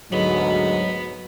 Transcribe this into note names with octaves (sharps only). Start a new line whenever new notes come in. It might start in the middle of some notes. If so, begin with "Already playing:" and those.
D2 G#2 F#3 B3 D#5